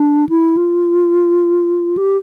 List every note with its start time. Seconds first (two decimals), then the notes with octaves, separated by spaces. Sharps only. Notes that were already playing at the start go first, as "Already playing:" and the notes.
Already playing: D4
0.29 E4
0.57 F4
1.97 G4